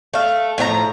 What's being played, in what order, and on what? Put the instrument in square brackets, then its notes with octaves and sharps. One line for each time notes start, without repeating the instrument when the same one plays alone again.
[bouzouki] A3 F5
A2 F3 F#4 A#5